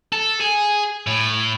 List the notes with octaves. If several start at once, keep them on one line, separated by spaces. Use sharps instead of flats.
A4
G#4
A2